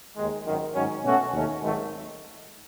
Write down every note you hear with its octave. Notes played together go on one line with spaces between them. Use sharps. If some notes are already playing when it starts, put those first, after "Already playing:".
D#2 D#3 G#3
G#1 F#2 D#3
G#2 D#3 F#3 C#4
B2 A3 C#4 F#4 A4
D#2 D#3 A3 C#4
G#1 G#2 D#3 F#3 A3